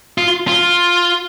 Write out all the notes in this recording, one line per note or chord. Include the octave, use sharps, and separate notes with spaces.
F4
F4